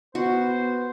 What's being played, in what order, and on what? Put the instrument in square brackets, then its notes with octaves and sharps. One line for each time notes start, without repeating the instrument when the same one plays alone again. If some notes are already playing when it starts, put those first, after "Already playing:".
[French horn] B3 [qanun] F#4 [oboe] C5